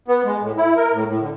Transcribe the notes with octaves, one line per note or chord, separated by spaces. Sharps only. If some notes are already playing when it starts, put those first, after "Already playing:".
B3
G#3
A2
E4
A#4
A2
A2
D3